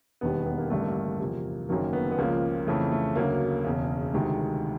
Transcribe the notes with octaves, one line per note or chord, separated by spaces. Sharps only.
E1 D#2 D#3 G3 B3
B3
A#3
A1 G2 D3 G3 A3
A#3
E2 C3 F3
F#1 F#2 D#3 F#3 A#3
B3
B3
C#2 C#3 F3 A#3
F2 C#3 E3 A3
A3
D2 C#3 F#3 A#3
E1 E2 C#3
D2 C3 D#3 G#3